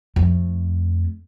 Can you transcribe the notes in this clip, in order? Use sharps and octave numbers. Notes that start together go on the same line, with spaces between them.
F2 A3